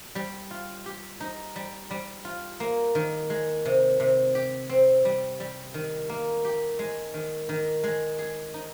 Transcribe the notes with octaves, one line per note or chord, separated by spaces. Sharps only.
G3
F4
G4
D#4
G3
G3
F4
A#3
D#3
G#3
C3
C3
G4
C4
G3
G3
D#3
A#3
G4
G#3
D#3
D#3
G#3
G#4
D#4